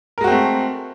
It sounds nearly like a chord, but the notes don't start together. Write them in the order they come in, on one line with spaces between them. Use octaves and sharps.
A#4 G#3 F#4 C4 A3